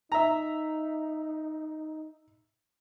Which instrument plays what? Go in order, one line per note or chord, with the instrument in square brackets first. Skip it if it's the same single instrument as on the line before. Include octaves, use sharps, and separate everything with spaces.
[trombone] D#4 [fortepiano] E5 A#5